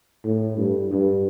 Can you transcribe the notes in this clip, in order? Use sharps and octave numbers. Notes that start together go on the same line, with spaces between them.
A2
G2
G2